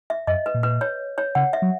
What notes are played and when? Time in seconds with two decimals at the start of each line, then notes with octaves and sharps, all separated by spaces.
0.10 E5
0.27 F#2 D#5
0.46 B4
0.54 A#2
0.63 B4
0.81 C#5
1.18 C#5
1.35 C#3 F#5
1.53 E5
1.62 F#3